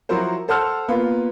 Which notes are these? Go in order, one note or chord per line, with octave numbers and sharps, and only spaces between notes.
F3 F#3 E4 F#4 A#4 C5
A4 C5 F#5 A5 E6 F6
A#3 B3 F4 A#4 B4